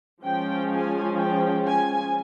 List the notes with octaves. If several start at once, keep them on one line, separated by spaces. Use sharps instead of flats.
F3 G#3 C#4 G5
G#5
G5
G#5